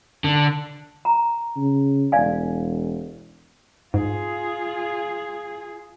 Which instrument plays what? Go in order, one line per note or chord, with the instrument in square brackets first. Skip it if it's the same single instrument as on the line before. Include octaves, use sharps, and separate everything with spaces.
[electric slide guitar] D3
[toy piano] A#5
[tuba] C#3
[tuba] E1 [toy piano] D5 F5 G#5
[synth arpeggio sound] G#2 [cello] F4 G#4